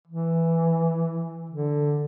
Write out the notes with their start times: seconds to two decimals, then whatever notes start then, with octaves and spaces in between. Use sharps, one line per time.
0.07 E3
1.50 D3